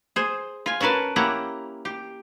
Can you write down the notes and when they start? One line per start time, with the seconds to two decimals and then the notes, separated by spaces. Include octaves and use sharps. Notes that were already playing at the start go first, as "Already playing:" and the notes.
0.16 G#4 C5
0.66 F4 G#5
0.80 C#4 F#4 A#4 B4 A5
1.16 A#3 C#4 E4 G4 F#5 A#5
1.85 G4